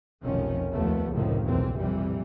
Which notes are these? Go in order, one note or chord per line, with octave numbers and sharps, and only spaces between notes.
F1 B1 D#3 F3 C#4
F1 D#2 F3 A3 B3
F1 C#2 A2 D#3 F3
F#1 B1 E2 E3 C4
A#1 F2 C3 E3 G3